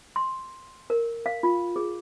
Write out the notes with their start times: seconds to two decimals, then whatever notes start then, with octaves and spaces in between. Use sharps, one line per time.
0.16 C6
0.90 A#4
1.26 F5
1.43 F4
1.76 G#4